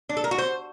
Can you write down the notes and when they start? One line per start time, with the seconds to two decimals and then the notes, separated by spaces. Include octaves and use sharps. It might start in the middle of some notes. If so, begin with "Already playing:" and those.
0.09 D4
0.17 A4
0.24 A#4
0.31 F#4
0.38 C5